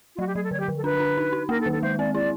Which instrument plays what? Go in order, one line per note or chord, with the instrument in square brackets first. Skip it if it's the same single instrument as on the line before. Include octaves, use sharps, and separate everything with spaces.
[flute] F4
[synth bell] F#3 [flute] F#4
[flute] G4
[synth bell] F#3 [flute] G#4
[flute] A4
[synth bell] D3 [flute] C#5
[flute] G4
[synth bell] D3
[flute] A4
[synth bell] D4 [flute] B4
[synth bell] D4
D#4
D#4
[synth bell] A#3 [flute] A#4
[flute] A4
[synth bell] D#3
[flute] A4
[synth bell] G#3 [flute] C5
[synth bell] C4 [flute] D5
[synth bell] E4 [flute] D5